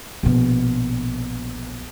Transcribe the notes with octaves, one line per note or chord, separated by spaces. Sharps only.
A#1 B2